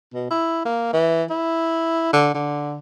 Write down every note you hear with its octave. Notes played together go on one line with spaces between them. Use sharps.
B2
E4
A#3
E3
E4
D3
D3